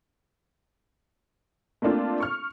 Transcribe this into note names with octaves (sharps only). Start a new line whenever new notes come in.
A3 A#3 C4 D4 F4
C#6 F6